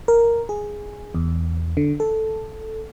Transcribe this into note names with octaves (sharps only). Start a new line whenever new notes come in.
A#4
G#4
E2
D3
A4